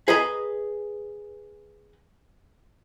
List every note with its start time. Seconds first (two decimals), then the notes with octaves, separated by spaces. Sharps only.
0.08 G#4 B4 D#5 G#5 A#5